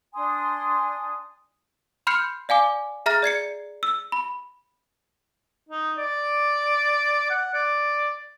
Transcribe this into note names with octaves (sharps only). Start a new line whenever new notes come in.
D4 G#5 C6 D#6
B5 C6 F6 G6 C7 C#7
D5 F5 G#5 D6
G#4 E5 A#5 F6 A6 A#6
D5 G#6 C7 C#7
E6
B5
D#4
D5
F#5
D5